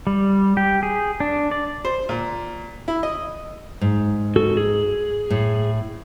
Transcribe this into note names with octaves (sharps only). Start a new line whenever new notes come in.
G3
G4
G#4
D4
D5
C5
A#2
E4
D#5
G#2
F#4 A4
G#4
A2